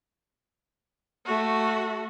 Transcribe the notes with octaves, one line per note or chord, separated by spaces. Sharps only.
A3 F#4